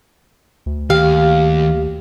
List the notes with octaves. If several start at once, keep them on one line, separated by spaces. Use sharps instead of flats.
D2
D#2 G4 F5